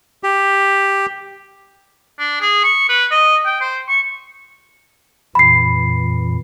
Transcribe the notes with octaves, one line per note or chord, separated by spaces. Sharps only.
G4
D4
G#4
C#6
B4
D#5
G5
C5
C#6
F2 A#2 E3 B5 C7